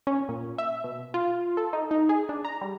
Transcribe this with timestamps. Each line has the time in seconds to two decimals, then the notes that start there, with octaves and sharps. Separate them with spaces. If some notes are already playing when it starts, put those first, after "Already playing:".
0.07 C#4
0.29 A#2
0.58 E5
0.84 B2
1.14 F4
1.57 A4
1.73 D#4
1.91 D#4
2.09 G#4
2.29 D4
2.45 A#5
2.61 G3